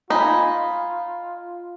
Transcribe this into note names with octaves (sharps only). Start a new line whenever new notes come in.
D#4 F4 G#5 B5